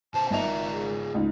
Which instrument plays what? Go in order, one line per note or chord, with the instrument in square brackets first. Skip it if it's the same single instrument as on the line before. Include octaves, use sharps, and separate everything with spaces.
[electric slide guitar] B2 C5 [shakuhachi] A5
[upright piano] G#1 D#5 F7 [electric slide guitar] G#2 F4 A#5 [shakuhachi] E5
[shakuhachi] G#4
[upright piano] C#2 D#4